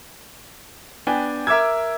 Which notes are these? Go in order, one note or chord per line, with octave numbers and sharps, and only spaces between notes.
B3 D4 G5 G#5
A#4 E5 D6 E6 G#6